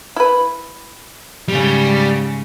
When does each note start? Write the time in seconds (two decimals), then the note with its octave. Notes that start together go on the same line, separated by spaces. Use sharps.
0.16 E4 B4
1.48 G#2 C#3 G3